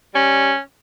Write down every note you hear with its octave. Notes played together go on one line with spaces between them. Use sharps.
G3 C#4